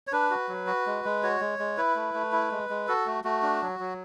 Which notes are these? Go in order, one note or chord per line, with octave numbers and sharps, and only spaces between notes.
C#5
D4 B4
F#4
F#3
F#4
G#3
G#3
F#4 C#5
G#3
G#3
E4 B4
A3
A3
E4
G#3
G#3
F#4 A4
A3
A3 F#4
D4
F#3
F#3